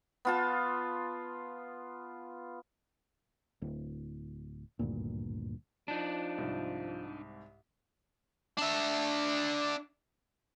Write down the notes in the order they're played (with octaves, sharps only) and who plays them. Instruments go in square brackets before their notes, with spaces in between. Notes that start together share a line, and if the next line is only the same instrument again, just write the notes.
[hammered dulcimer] B3 F4 A5
[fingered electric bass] D1
G#1 D2 G2 A#2
[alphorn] F3 [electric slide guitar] D4 D#4
[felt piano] C2 G#2
[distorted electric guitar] D4 E5